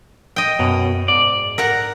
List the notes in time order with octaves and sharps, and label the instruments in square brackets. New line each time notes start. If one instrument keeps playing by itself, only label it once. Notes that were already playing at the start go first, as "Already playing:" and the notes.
[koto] D#5 G5
[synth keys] F#2 [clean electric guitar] B2
[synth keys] G#2 [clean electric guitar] D5
[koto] A#4 F#5 A#5